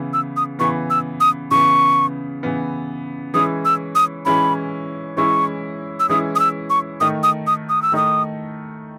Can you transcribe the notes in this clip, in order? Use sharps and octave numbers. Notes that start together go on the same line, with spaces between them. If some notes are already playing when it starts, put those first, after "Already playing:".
Already playing: C#3 E3 B3
E6
D#6
C#3 E3 B3 C#6
E6
D#6
C#3 E3 B3 C#6
C#3 E3 B3
E3 G#3 C#4 E4 D#6
E6
D#6
E3 G#3 C#4 E4 B5
E3 G#3 C#4 E4 C#6
E6
E3 G#3 C#4 E4 D#6
D#6
E6
C#6
D#3 A3 D#4 D#6
D#6
D#6
D#6
E6
D#3 A3 D#4 D#6